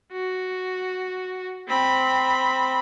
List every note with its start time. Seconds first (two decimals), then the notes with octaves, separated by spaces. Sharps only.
0.12 F#4
1.67 C4 B5